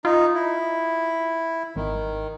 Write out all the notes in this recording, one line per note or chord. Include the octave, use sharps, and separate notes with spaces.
D#4 F4
E4
G#1 D#3